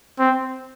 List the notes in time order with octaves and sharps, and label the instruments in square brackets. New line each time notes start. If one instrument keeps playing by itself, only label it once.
[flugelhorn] C4